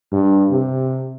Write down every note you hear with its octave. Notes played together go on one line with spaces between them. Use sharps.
G2
C3